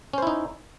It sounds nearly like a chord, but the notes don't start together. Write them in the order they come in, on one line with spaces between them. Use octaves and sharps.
C#4 C5 E4 D#4